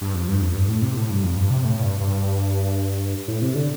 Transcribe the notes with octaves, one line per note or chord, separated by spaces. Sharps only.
G2
F2
G2
F2
G2
A2
C3
A2
G2
F2
G2
C3
A2
G2
G2
A2
C3
D3